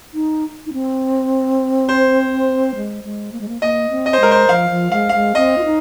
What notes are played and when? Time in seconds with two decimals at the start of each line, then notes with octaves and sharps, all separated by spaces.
0.14 D#4
0.66 D#4
0.73 C4
1.89 C5
2.76 G#3
3.04 G#3
3.32 A#3
3.41 G#3
3.48 A#3
3.62 A#3 D#5
3.90 C4
4.06 D#5
4.13 C5
4.20 G#3 A#4
4.31 C5
4.49 F3 F5
4.71 F3
4.92 G#3 F5
5.09 F5
5.14 G#3
5.35 C4 D#5
5.58 F4
5.65 D#4